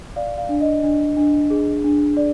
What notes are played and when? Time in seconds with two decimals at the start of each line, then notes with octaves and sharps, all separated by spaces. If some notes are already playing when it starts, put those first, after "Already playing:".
0.16 D5 F5
0.38 F5
0.49 D4
0.61 D#5
0.83 D4
1.17 D4
1.50 G#4
1.84 D4
2.17 D5